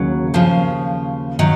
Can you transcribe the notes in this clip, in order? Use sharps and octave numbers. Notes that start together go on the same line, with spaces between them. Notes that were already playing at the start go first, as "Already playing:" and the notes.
Already playing: D#2 C#3 F#3
D#2 C#3 F3
D#3 F#3